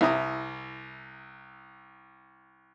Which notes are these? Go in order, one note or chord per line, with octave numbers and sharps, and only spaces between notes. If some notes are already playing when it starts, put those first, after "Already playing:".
C2 E4 A#5 D#6